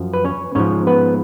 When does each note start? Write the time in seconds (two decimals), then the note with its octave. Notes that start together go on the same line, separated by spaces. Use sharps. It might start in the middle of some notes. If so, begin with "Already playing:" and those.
Already playing: F#2 F3
0.14 B4
0.25 C#4 C#5
0.55 G#2 F3 C#4 C#5
0.87 B3 B4